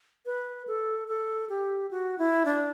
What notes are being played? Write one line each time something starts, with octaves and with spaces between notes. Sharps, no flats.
B4
A4
A4
G4
F#4
E4
D4